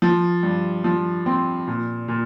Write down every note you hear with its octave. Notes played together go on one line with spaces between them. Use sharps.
F3
G2
F3
C4
A#2
A#2